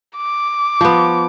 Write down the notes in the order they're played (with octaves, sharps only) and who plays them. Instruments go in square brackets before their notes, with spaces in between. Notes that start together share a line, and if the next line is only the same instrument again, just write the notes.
[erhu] D6
[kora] F3 B3